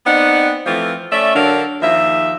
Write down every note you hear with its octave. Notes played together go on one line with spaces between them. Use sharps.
B3 C4 D#4 D5 F#5
E3 F3 A3 C4 F4
A3 C#4 D5 E5
D3 F#3 D4 A#4 F5
D#2 F3 E5